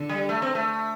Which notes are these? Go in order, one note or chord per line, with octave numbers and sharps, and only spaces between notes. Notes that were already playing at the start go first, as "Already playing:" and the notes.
Already playing: D3
G3
A3
C4
A3